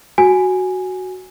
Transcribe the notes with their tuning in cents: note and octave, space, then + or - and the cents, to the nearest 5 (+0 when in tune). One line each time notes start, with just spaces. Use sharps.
F#4 +0 G#5 +0